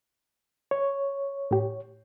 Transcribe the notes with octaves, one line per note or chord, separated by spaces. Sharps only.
C#5
A2 G4